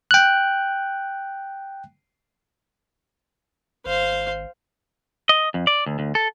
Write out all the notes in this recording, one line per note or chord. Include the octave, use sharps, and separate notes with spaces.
G5 F#6
G#1 C5 F5
D#5
F2
D5
D2
D2
A4